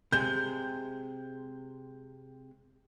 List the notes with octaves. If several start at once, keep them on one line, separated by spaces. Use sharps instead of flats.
C3 G#3 G6